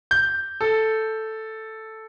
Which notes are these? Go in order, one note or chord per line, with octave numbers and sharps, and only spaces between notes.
G6
A4